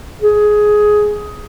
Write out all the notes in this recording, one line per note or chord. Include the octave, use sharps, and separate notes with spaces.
G#4